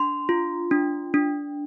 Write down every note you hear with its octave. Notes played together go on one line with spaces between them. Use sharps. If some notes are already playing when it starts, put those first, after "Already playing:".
Already playing: D4 C6
F4
D4
D4